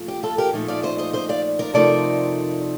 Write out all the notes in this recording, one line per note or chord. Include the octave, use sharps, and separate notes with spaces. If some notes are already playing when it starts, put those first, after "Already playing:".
Already playing: A#2 F3 A3
G4
F4 A4
G4 A#4
A#2 F3 A3 D#4
D5 F5
C5 D#5
C5 D#5
C5 D#5
D5 F5
A#4 D5
F2 C3 F3 A3 D#4 A#4 D5